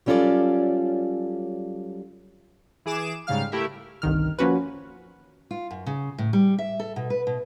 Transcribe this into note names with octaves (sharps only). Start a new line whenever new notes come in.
F#3 G3 C#4 F4 A4 D5
E3 G#4 D6 E7
G#2 C#3 G3 F5 F6
A3 E4 G4 A#4 E5
G1 C2 D#3 F6
F3 A#3 C#4 F#4 B4
F4
F#2
C#3
A2
G3
E5
A4
B2
B4
B2